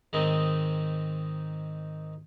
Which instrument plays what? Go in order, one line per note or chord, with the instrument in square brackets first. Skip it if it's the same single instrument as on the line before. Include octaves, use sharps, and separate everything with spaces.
[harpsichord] G#2 D#3 C4 D#4